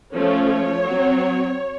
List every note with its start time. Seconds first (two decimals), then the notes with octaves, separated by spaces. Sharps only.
0.15 F3 A3 C#4 C#5
0.86 F#3
0.91 C4